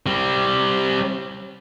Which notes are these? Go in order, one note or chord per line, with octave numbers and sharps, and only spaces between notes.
G3 C4